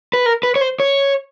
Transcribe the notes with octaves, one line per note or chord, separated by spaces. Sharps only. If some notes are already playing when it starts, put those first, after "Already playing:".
B4
A#4
B4
C#5
C5
C#5